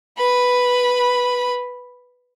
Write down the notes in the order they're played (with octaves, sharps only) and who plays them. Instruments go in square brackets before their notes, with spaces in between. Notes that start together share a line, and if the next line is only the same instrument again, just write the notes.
[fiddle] B4 B5